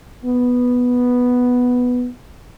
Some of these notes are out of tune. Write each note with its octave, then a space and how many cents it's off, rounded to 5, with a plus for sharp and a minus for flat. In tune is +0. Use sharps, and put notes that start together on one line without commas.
B3 +0